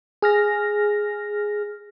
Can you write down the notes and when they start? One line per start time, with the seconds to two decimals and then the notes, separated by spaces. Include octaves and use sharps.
0.22 G#4 F6 A#6